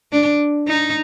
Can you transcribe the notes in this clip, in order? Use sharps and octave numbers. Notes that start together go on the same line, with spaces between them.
D4
D#4